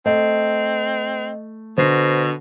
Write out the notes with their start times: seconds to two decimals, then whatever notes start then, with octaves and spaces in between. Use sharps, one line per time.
0.06 A3 C4 D#5
1.78 B2 D3 C5 A#6 C7